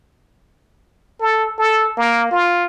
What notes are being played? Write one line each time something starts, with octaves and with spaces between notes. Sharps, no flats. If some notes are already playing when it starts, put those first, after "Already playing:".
A4
A4
A#3
F4